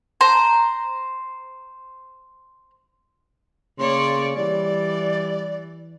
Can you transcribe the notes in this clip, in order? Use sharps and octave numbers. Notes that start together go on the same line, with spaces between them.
C5 A#5
C#3 A#3 C#5 D5 C6
E3 G3 D5